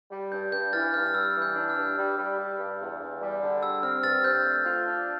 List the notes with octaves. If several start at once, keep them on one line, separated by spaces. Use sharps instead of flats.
G3
G2 G6
G2 G6
E3 F6 A6
G2 F6
F6
G3 E6
E3
G6
D4
F6
G2
G3
G3
G3
G2
E2
E2
G3
D3
G3 E6
C4 F6
G2 F6 A6
C4 G6
A3
F4
D4